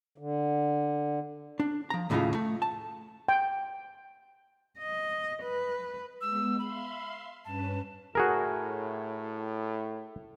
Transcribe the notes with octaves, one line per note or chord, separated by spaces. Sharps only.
D3
D4
F3 A#5
D#2 A2 C#3 C#4 D#4 F4
A3
A5
G5
D#5
B4
G#3 B3 E6
E5 F5 B5 C6
G2 C#4 B4 A5
A2 F#4 G#4 A#4